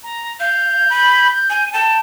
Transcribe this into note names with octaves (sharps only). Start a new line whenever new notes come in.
A#5
F5 G6
B5
G#5
G5 A5